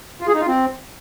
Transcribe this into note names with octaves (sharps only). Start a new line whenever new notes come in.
F4
G#4
D#4
F4
C4